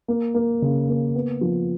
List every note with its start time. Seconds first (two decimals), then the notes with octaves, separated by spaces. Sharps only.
0.08 A#3
0.34 A#3
0.62 C#3
0.88 A#3
1.15 B3
1.41 F3